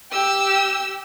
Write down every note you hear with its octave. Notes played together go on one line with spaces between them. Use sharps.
G4 E6